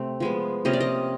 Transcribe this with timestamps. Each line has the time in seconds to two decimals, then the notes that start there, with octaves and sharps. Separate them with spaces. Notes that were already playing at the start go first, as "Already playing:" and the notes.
Already playing: C3 A3 C4
0.20 F3 G#3 B3
0.65 C3 F3 A#3 C#4 D#5
0.73 D5
0.81 D#5